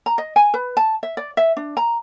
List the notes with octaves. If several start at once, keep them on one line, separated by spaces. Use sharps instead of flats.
A#5
D#5
G#5
B4
A5
E5
D5
E5
D4
A#5